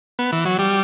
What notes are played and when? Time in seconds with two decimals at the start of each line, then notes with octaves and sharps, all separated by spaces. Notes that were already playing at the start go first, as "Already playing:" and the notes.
0.19 B3
0.32 E3
0.45 F#3
0.59 G3